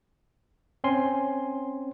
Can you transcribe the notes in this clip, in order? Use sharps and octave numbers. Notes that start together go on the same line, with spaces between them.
C4 C#4 G#5 C6